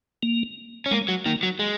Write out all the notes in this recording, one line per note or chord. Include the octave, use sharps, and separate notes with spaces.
A#3
C#4
G#3 A#3
F#3
D#3 A#3
F#3
G#3